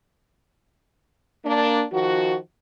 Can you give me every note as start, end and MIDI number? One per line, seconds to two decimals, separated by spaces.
1.45 1.83 58
1.45 1.83 62
1.92 2.35 51
1.92 2.35 53
1.92 2.35 66